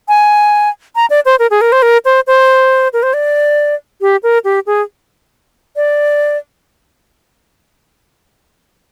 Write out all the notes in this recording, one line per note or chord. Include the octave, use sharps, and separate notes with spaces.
G#5
A#5
D5
C5
A#4
G#4
A#4
C5
A#4
C5
C5
A#4
C5
D5
G4
A#4
G4
G#4
D5